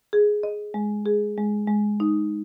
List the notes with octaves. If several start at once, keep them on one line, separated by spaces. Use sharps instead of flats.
G#4
D#5
G#3
G#4
G#3
G#3
D#4